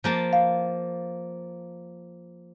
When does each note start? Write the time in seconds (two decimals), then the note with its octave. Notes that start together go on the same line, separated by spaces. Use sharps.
0.04 F3 A#3 A5
0.33 F5